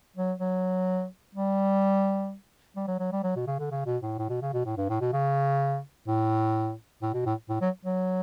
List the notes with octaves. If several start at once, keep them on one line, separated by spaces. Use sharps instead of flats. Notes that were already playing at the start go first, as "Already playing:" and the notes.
F#3
F#3
G3
G3
F#3
F#3
G3
F#3
B2
C#3
D3
C#3
B2
A2
A2
B2
C#3
B2
A2
G2
A2
B2
C#3
A2
A2
B2
A2
A2
F#3
F#3